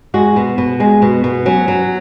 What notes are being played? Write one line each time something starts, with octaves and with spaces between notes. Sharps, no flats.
G#3 F#4
B2
B2
G#3
B2
B2
F#3 C#4
F#3